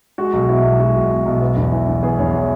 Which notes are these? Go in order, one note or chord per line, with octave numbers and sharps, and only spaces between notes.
G#3 F#4
B1
B2 E4
B1
G#3 F#4
B1
B2
B1
B3
E2
E3
E2
B3 G#4
E2 C#5
E3 G#4